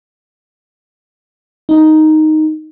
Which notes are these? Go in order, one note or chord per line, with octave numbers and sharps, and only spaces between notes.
D#4